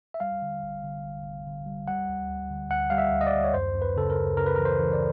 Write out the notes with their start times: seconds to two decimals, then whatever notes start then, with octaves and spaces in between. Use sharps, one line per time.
0.14 E5
0.20 G3 F5
0.42 D3
0.63 G1
0.83 D3
1.04 G1
1.25 G1
1.46 D3
1.66 G3
1.88 G3 F#5
2.08 D2
2.29 D2
2.50 D3
2.70 D2 F#5
2.90 G3 F5
2.98 E5
3.12 D2
3.21 D#5
3.27 D5
3.33 D2
3.44 C#5
3.54 F#2 C5
3.74 F#2
3.82 B4
3.96 C#3 A4
4.10 A#4
4.16 F#2
4.37 C#3 A#4
4.46 B4
4.56 E3 A#4
4.65 C5
4.79 E3
4.93 D5